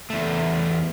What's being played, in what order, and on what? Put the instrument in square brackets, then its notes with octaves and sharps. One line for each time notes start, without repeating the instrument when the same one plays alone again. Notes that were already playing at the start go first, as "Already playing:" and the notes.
[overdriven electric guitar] E2 A3